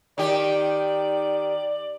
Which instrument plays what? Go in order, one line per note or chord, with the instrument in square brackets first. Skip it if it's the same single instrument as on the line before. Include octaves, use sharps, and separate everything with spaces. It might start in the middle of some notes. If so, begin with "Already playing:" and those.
[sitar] D#3 G4 [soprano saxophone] D5